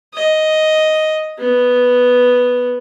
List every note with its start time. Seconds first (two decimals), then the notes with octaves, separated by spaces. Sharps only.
0.14 D#5
1.39 B3